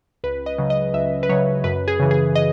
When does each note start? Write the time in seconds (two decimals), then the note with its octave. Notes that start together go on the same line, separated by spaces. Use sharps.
0.24 C#2 B4
0.46 D#5
0.58 C#3 F#3
0.70 D#5
0.94 C#2 E5
1.23 B4
1.29 C#3 F#3 C#5
1.64 F#2 B4
1.88 G#4
2.00 C#3 E3
2.11 G#4
2.35 D#5